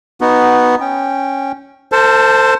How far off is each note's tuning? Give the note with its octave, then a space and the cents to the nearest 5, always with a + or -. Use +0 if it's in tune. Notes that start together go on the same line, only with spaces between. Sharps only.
B3 +0 D#4 +0 F#4 -5
C#4 -10 G5 +0
A4 +40 C5 +0 A5 +0